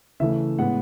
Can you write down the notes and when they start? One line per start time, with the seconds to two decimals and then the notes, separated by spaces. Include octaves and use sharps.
0.20 C#3 E3 A3 C#4 E5
0.58 A2 G#3 B3 F#5